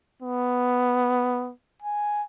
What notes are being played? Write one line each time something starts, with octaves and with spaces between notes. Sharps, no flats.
B3
G#5